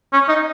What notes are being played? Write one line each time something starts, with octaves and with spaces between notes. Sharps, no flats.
C#4
D#4